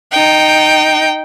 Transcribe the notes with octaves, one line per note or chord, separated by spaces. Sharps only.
D#4 G5